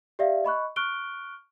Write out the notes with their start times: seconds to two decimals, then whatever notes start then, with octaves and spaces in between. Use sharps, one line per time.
0.19 G4 D5 E5 F5
0.44 D#5 B5 C#6 F#6
0.76 C#6 F6 F#6 D7 G7